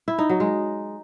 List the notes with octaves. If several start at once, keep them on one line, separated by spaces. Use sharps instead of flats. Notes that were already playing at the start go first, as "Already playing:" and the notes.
E4
D#4
F#3
G#3